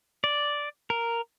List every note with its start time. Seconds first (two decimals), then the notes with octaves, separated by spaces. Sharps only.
0.24 D5
0.90 A#4